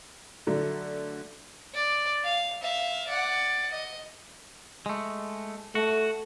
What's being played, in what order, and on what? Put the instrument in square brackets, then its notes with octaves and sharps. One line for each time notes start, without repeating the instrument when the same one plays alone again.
[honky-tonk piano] D3 F#3 A3
[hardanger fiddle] D5
F5
E5 F5
D5 F#5
D#5
[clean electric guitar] G#3 A3
[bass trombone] A3 [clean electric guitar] F#4